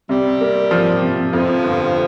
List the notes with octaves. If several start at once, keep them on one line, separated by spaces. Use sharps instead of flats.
C3 G3
A#3
F3
C3
F2 F3
G1